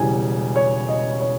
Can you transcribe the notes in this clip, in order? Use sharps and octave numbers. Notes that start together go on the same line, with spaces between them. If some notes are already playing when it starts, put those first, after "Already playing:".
Already playing: E1 C#3 E3 G3 G#5
C#5
D#5
C#5